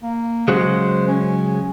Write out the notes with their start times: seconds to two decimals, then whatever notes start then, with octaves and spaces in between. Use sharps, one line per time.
0.03 A#3
0.48 C#3 F#3 G#3 C5
1.08 C#4